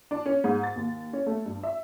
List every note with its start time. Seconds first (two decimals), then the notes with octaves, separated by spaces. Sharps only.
0.11 D4
0.26 C#4
0.44 G#2
0.63 A6
0.76 D#2
1.13 C#4
1.26 A3
1.46 G2
1.63 E5